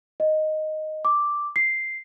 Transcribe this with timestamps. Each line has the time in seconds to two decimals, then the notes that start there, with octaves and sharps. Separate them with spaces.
0.20 D#5
1.05 D6
1.56 C7